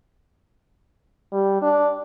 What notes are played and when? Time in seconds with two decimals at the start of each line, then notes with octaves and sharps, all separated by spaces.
1.32 G3
1.62 D4